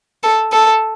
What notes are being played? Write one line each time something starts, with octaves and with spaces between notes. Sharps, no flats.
A4
A4